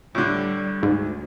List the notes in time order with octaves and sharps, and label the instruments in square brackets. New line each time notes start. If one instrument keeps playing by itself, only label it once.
[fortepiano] A2 D3 [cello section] G3
[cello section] D2 [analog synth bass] G#2